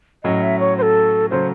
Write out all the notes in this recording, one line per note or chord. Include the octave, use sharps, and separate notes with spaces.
A2 F#3 C#4 D#5
E5
C#5
C5
A4
C#3 F#3 A3 C#4 C5